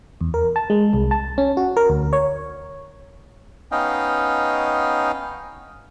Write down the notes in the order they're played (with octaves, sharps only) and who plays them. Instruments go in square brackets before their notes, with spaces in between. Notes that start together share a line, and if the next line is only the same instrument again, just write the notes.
[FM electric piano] E2
A#4
A5
G#3
C2
A5
C#4
F#4
A#4
D2
C#5
[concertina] B3 C#4 D#4 D#5 F5 G5